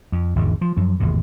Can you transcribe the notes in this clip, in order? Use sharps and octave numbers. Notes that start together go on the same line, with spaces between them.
F2
G#1 E2 G#2 D3
F3
F#2 F3
G#1 E2 A2 C3